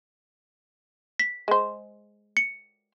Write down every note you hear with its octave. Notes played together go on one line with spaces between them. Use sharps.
B6
G#3 C5
C#7